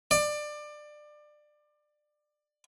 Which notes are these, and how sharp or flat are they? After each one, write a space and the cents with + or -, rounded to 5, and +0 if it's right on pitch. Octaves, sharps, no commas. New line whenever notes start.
D5 +25